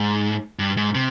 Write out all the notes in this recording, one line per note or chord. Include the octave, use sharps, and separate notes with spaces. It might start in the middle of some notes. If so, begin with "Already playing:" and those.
Already playing: G#2
G2
G#2
C3